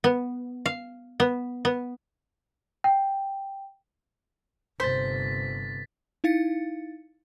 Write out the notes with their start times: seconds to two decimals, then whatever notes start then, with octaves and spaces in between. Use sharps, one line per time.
0.04 B3
0.66 F5
1.20 B3
1.65 B3
2.84 G5
4.80 G1 C3 C5 A6 B6
6.24 D#4 E4 F5 A6 C#7